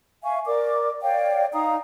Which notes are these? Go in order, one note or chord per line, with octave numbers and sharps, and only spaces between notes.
E5 F5 G#5 C#6
A#4 D5 D6
C#5 D5 F5 G5
D#4 F5 A#5 D#6